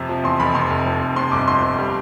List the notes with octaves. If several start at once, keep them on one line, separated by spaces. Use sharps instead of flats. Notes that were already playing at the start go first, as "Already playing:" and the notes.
Already playing: F2 C3
F3
E2 C6
F1 B5
C3 C6
F1
F2
F1
C3 C6
G1 D6
F2 C6
G1
G3